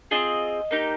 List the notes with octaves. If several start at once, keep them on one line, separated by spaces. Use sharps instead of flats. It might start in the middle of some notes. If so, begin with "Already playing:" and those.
C4 F4 G#4 D#5
A#3 D#4 G4